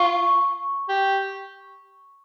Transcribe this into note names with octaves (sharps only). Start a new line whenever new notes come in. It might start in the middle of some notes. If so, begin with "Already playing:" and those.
Already playing: F4 C#6
G4